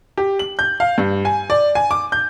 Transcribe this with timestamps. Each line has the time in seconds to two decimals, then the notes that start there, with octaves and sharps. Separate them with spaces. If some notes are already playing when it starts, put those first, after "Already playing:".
0.18 G4
0.39 F#7
0.59 G6
0.80 F5
0.98 G2
1.25 G#5
1.50 D5
1.75 G#5
1.91 D6
2.12 G6